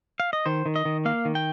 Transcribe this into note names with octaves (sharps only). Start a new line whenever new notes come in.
F5
D#5
D#3 C5
D#3
D#5
D#3
A#3 F5
D#3
G5